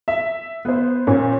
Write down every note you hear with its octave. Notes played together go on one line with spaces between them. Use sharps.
E5
B3 C5
A#2 C#4